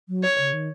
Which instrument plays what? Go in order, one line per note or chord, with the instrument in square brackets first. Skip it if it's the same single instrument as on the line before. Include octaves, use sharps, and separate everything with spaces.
[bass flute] F#3
[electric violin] C#5
[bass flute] C#3
D#3